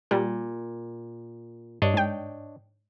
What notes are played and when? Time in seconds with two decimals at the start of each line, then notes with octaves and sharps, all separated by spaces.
0.11 A#2 G3
1.82 G2 D4 C#5 D#5
1.94 G#2 G5